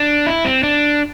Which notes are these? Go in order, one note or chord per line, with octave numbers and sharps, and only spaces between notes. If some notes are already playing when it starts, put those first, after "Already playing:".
Already playing: D4
E4
C4
D4